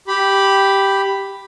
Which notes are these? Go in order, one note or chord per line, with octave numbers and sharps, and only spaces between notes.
G4 B5